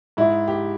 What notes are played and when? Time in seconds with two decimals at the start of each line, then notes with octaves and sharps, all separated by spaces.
0.17 G#2 E4
0.48 G4